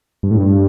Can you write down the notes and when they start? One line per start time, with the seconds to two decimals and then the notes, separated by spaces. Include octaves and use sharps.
0.23 G2
0.31 A2
0.37 G2